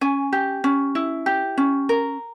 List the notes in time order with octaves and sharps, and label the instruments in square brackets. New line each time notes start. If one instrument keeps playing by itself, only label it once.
[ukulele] C#4 G#5
G4
C#4
E4
G4
C#4
A#4